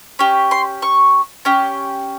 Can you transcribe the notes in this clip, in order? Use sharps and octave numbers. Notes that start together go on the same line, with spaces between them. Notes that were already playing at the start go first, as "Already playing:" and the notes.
C#4 G4
C6
C#6
C#4 G4